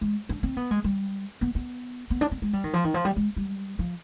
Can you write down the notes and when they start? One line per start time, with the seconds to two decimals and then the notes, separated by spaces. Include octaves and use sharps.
0.01 G#3
0.29 D4
0.43 C4
0.57 B3
0.71 G#3
0.84 G3
1.41 B3
1.55 B3
2.10 B3
2.21 D4
2.31 C4
2.42 G#3
2.53 G3
2.64 D#3
2.73 F3
2.84 D#3
2.94 F3
3.05 G3
3.16 G#3
3.37 G3
3.79 F3